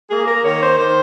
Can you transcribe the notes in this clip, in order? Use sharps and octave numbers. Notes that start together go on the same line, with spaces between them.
A#3 G#4
A#4
D#3 C#5
C5
D#3 C5